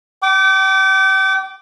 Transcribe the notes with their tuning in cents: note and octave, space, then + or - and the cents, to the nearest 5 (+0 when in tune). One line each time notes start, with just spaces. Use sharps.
G5 -40 D6 -10